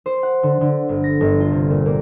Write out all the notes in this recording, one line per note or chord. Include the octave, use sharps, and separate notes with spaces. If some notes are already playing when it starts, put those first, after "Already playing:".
C5
F#5
D3
D3
G1
A#6
G1
F4
C3
A#2
A#3